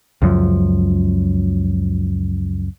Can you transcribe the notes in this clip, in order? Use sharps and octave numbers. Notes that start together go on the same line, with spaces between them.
C#2 F#2 F3